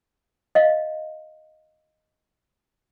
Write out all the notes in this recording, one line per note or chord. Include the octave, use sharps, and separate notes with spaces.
D#5 F5